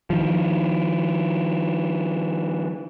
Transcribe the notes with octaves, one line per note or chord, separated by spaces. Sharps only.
D#3 F3